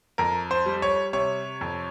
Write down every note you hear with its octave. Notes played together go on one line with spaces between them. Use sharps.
F2 A#4
C5
G3
C#5
C3 C#5
F2